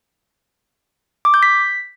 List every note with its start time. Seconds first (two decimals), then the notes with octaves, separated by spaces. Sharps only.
1.25 D6
1.34 G6
1.43 B6